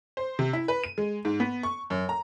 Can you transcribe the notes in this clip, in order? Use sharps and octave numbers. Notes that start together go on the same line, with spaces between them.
C5
C3
E4
B4
D#7
G#3
G#2
B3
C#6
F#2
A#5